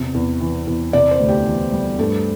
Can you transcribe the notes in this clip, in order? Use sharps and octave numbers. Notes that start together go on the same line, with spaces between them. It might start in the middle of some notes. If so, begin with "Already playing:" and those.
Already playing: E2 C3
E2
E3
E2
C3 D5
C5
D2
G4
E3
G3
G2 A3